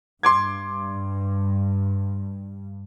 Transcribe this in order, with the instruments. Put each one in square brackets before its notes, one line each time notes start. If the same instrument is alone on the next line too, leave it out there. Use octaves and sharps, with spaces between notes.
[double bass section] G2 [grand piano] C6 D6 G#6